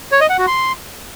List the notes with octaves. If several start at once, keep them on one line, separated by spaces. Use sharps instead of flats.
C#5
D#5
F#5
F#4
C6